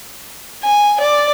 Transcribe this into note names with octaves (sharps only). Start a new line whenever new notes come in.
G#5
D5